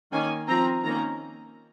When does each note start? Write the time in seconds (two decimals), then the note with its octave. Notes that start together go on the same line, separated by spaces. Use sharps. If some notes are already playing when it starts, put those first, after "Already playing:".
0.12 D#3 A#3 C#4 G#5
0.48 F3 C4 A#5
0.84 D#3 A#3 C#4 A#5